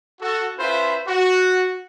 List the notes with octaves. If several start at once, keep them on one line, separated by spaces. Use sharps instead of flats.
F#4 A4
C#4 E4 F4 B4 C5 E5
F#4